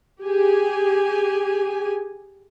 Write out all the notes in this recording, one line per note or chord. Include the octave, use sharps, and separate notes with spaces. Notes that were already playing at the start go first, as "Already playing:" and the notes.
G4 G#4 G#5